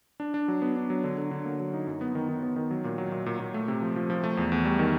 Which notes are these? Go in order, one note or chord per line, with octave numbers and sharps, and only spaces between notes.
D4
D4
F#3
B3
D4
F#3
D3
D3
D3
A#3
F#3
D#4
F#2
B3
D#3
D#3
B3
D#3
F#3
A#2
F#3
A#2
A#2
A#2
A3
C3
F3
F3
F3
A3
E2
E2
G3
D#3